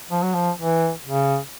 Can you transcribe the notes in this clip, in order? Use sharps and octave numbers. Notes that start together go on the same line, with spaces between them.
F3
F#3
F3
E3
C#3